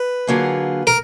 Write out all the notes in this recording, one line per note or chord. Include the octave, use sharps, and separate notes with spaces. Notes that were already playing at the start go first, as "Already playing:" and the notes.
Already playing: B4
D3 F#3 A#3 F4 G#4
A#4